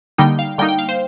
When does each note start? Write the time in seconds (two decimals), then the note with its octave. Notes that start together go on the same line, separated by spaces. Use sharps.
0.18 D3 G3 A#3 D#4 G5
0.39 F5
0.58 D3 G3 A#3 D#4 G5
0.69 G5
0.79 F5
0.89 C5